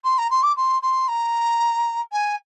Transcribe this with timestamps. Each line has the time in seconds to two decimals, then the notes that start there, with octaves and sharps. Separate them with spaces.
0.04 C6
0.18 A#5
0.30 C6
0.43 D6
0.56 C6
0.82 C6
1.08 A#5
2.12 G#5